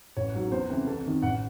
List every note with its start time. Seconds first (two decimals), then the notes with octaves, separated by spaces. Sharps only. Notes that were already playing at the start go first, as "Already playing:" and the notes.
0.17 A1 C#5
0.34 G#2 F#3
0.51 E2 C5
0.70 C#3 E3 A3 C4
0.87 C2 A4
1.05 C3 D#3
1.22 A1 F#5